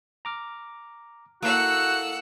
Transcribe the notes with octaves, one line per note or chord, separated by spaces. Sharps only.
A#5 D6 F6
A#3 E4 F#4 A4 F#5 E6